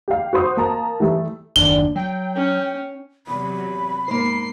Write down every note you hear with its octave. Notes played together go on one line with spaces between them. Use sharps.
G4 F5
F#4 C5 C6 D#6
A#3 A5 A#5
E3 G3 A3
F#1 D#2 D4 G7
F#3 G5
C#4
E2 C3 F#3 B5
G#2 A#3 C5 C7